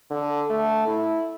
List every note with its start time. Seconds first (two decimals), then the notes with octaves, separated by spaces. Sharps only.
0.11 D3
0.50 A3
0.87 E4